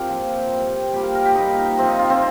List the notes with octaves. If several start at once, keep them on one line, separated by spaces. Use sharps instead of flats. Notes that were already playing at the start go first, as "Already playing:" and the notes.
Already playing: C4 F4 G4 A#4
A#2 F3
C3 G3
A#2 G3 G4
A#4
A#4
G4
A#2 G3 D#4
C3 F3 C4
D#4
F4
C4